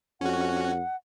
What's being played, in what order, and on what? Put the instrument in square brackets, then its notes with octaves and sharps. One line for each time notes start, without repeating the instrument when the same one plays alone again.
[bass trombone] F2 [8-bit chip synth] C#4 F#4 [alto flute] F#5